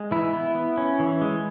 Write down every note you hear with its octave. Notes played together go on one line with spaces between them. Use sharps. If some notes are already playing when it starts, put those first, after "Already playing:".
Already playing: G#3
E3 E4
B3
B3
C#4
E3
G#3